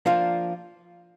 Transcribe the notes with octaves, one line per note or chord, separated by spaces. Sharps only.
F3 A#3 D4 F4